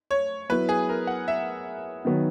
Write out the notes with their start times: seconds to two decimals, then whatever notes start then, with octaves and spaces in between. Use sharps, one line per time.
0.11 C#5
0.49 F#3 B3 E4 B4
0.69 G#4
0.89 A#4
1.07 F#5
1.28 E5
2.05 D#3 F#3 B3